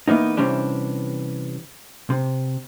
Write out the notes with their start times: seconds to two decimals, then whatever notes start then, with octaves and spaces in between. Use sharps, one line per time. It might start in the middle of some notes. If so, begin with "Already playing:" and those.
0.08 E3 A#3 B3 D#4
0.37 C3 E3 G3 C#4 D4
2.10 C3